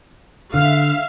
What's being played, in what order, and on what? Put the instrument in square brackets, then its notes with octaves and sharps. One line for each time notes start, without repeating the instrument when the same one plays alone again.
[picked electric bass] D3 [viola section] E5 F5